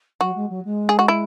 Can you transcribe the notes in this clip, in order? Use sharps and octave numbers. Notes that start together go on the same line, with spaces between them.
F#3 F#4
G#3
F#3
G#3
G#4
F#4
E4